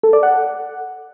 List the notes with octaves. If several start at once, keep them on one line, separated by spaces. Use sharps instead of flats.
A4
D5
F#5